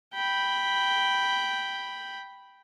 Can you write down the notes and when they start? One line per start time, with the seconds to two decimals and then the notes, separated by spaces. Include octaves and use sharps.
0.14 G5 B5